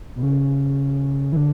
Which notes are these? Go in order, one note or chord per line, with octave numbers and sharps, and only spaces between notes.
B2
C#3
E3
D3